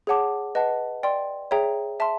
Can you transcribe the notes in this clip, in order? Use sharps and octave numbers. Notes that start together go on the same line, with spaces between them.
G#4 C#5 F#5 A5 D6
B4 D#5 F#5 A5
D5 G5 C6
G#4 C#5 E5 G5 A#5
E5 A5 C6